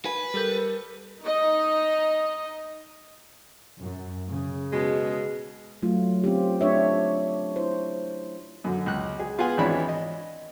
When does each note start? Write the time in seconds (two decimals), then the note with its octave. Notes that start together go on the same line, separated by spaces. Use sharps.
0.05 B4 G#5
0.34 G3 A4 A#4 G6
1.21 D#4 D#5
3.79 F#2
4.29 C#3
4.72 B2 G#3
5.82 F#3 A3 F4
6.24 C4 C#4 F4 G4
6.61 A3 D4 C#5 E5
7.56 E4 C5
8.64 F#2 D3
8.86 C#2 F#6
9.19 G#4
9.38 B3 F4 G#4 F#5 G#5
9.57 G#1 E3 D4 E4 C#5 B5
9.88 D#5